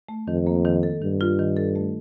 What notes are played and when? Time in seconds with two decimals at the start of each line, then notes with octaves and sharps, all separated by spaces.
0.09 A3
0.28 F2 D#3
0.47 A#3
0.65 D#3
0.83 A4
1.01 G2 D#3
1.21 F4
1.39 D#3
1.57 A4
1.76 A3